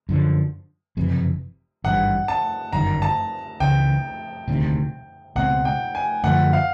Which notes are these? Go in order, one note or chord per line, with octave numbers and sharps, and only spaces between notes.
F#2 D3 F3
F#1 F2 C3 E3
G#1 G2 E3 G3 F#5
A5
G1 F#2 D#3 A#5
A5
C#2 C#3 E3 G5
E1 D2 C3 D#3
C#2 B2 G#3 C4 F#5
G5
G#5
F#2 D3 F3 A3 F#5
F5